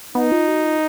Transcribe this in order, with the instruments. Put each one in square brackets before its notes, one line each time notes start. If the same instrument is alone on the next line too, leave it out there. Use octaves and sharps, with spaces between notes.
[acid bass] B3 [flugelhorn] D#4
[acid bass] F4
F#4
F4